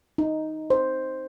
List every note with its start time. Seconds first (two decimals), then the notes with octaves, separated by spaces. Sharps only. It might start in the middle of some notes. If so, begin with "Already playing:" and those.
0.18 D#4
0.70 C5